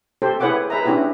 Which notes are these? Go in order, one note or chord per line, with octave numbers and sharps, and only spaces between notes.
G4 A4 C5
E4 G#4 B4 C#5 F#5 D6
G#4 B4 E5 A#5
C#4 D4 E4 F#4 G4 B4